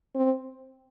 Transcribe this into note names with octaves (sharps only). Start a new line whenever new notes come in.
C4